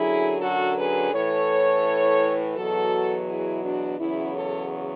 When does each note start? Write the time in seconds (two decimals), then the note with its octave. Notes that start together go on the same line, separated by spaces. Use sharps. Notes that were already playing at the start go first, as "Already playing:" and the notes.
Already playing: F#2 D3 F#3 E4 G#4
0.42 F#4 A4
0.77 G#4 B4
1.12 A2 E3 A4 C#5
2.56 E2 B2 F#3 F#4 A4
3.27 E4 G#4
3.63 D4 F#4
3.98 E2 C#3 F#3 C#4 E4
4.35 A4 C#5